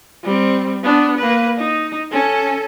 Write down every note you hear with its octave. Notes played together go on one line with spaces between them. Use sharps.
G3 C4
B3 D4
A#3 B4
D#4
C#4 A4